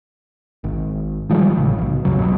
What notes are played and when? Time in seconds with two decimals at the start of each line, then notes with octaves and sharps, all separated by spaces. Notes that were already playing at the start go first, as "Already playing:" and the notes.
0.64 G#1
1.29 D#3 F3 G3 G#3
1.57 A1 C#3
1.78 D1 B1
2.05 C#2 F#2 C#3 F#3
2.19 C#2 B2 F#3